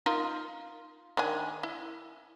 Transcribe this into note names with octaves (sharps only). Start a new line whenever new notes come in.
D#4 F4 A#4
D#3 D4 G#5
E4